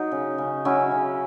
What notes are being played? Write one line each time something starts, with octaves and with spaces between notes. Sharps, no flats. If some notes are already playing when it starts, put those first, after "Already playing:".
Already playing: F#3 D#4
C#3
C#3
F#3 C#4 E4
C#3